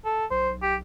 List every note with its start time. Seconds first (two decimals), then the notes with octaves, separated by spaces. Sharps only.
0.05 A4
0.31 B1 C5
0.62 G4